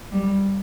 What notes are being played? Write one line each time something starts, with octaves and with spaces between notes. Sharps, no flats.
G3